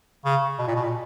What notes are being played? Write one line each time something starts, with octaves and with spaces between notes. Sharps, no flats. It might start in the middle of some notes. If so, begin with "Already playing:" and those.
C#3
B2
A#2
B2
A#2